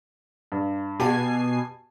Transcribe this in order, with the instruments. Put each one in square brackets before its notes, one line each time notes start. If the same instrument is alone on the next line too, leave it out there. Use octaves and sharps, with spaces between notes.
[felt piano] G2
[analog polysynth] B2 G#5 C7 [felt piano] G4 A5